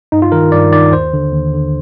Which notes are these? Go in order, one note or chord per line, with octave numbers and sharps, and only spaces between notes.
G2 D#4
F4
D#3 A#4
G2 D5
D#3 D5
D#2 C5
D3
D#2
D3